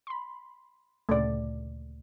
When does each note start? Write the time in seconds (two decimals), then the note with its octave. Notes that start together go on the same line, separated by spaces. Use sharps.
0.07 B5 C6
1.09 D2 A#2 C#3 A3 D5